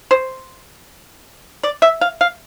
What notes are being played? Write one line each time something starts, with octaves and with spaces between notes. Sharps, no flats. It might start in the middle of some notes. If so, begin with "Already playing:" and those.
C5
D5
E5
F5
F5